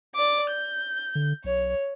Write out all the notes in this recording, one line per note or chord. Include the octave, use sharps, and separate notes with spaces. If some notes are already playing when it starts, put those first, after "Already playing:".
D5 D6
G6
D3
B1 C#5